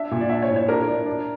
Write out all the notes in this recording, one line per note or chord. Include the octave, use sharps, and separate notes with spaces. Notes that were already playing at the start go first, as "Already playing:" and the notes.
Already playing: D4 E5
A#2
D5
D4 E5
C#5
A2
C#5
D4 A#4
D4
D4